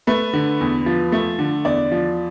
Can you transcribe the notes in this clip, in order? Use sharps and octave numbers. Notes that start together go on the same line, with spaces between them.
A3 B4
D3
E2
F3
A3
D3
E2 D5
F3